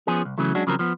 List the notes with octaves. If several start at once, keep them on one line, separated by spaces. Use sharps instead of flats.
F3 B3 C#4 G#4
C2
C#3 E3 F#3 A3
F#3 G#3 C#4 D4 F#4
C#3 F3 F#3 C4 A#4
F3 B3